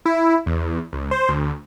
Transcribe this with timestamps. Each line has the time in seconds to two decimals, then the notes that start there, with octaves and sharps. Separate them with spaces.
0.05 E4
0.46 E2
0.93 C#2
1.11 C5
1.29 D2